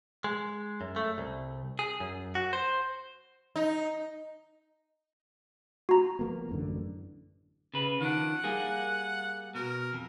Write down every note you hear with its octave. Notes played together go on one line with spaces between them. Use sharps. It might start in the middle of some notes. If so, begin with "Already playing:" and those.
G#3
F#2
A3
C2
G#4
F#2
F#4
C5
D#4
F#4 A#5
F3 A#3 B3
A1 F#2 D3
C#3 B4
D#3 F3 D4 F#5
G3 A#3 G#4
B2 A#4
F2